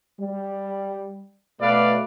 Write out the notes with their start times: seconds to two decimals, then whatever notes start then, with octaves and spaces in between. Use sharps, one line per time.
0.21 G3
1.61 B2 A3 B4 D5 F5